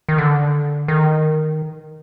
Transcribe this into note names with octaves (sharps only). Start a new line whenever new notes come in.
D#3
D3
D#3